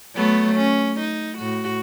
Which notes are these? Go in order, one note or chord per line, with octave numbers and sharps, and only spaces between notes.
F#3 A3 B3
C#4
D#4
A2 F#4